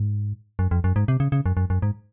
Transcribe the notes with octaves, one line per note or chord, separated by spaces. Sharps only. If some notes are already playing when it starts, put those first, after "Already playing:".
Already playing: G#2
F#2
F2
F#2
G#2
C3
C#3
C#3
F#2
F#2
F#2
G#2